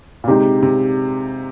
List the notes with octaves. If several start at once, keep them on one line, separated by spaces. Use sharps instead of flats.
A#2
C3 G#3 D#4 G4
C3